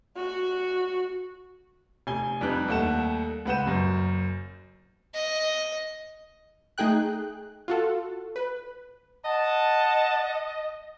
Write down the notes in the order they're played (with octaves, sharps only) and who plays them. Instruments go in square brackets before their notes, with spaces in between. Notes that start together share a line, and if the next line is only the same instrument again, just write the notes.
[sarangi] F#4
[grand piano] F1 G#5 G7
F2 G3 D4 D#4 B4 F#6
D#2 G3 A3 F#5 E7
C#2 B4 F#5 G6 E7
F#1 F#2
[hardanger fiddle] D#5
[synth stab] A3 D#4 G#4 G5 F#6
F4 F#4 A4
B4
[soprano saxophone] D#5 [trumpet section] F#5 A5